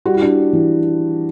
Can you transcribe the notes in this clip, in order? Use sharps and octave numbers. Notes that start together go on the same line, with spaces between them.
G3 F#4
E4
D4 F#4
E3